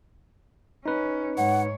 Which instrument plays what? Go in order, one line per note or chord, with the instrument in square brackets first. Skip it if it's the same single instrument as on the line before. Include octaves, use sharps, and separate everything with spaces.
[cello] C#4 [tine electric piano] D#4 B4
[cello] G#2 C#5 [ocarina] F#5